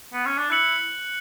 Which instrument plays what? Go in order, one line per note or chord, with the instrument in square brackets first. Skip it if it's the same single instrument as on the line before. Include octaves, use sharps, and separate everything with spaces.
[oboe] B3
C#4
D4
[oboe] E4 [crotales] F#6 C#7 F#7